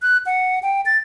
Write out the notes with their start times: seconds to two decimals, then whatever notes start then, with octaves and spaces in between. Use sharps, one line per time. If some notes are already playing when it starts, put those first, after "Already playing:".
0.02 F#6
0.26 F#5
0.63 G5
0.86 A6